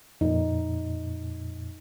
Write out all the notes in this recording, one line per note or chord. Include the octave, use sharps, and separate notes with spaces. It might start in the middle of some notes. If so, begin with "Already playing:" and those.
F2 A#2 D#4